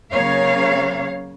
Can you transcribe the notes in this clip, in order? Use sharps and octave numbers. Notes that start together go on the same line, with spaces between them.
C#3 F#3 A#3 C#5 F5